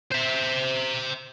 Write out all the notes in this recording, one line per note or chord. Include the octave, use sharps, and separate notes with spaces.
C5 E5